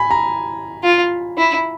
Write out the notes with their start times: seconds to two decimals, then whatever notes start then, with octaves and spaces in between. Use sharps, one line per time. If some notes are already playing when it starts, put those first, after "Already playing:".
Already playing: G#5 B5
0.11 A#5
0.84 F4
1.37 E4